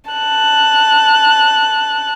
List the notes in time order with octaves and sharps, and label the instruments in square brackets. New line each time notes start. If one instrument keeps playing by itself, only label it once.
[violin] A5 F#6